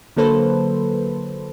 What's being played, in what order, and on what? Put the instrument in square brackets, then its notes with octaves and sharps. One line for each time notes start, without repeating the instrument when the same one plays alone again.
[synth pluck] D3 F#3 A#3 A4 B4 C5